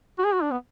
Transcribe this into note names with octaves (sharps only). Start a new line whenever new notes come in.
F#4
G#4
F#4
D4
B3